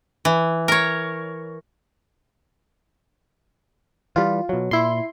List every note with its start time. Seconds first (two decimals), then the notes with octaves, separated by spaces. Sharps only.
0.25 E3
0.68 A#4 C#5
4.16 E3 G3 F4
4.49 B2 F#3
4.71 A#2 E4 C6